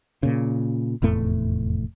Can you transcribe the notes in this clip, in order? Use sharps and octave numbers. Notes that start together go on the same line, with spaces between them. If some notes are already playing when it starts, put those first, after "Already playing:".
A#2 C#3
F1 E2 A2 A3